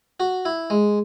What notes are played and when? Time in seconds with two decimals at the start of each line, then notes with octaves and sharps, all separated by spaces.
0.20 F#4
0.45 E4
0.70 G#3